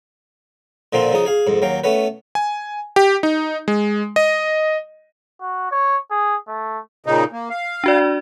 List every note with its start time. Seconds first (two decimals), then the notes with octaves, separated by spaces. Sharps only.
0.93 A#2 D3 F3 A#3 C4 F4
1.12 C#3 F3 D#4 D#6
1.26 G#4 F5
1.47 F2 G#2
1.62 D#2 F#3 F5 G5
1.84 A3 B3 C#4 B4
2.35 G#5
2.96 G4
3.23 D#4
3.68 G#3
4.16 D#5
5.41 F#4
5.71 C#5
6.11 G#4
6.48 A3
7.06 A#2 C#3 D#4
7.32 A#3
7.50 F5
7.84 D4 F#4 D5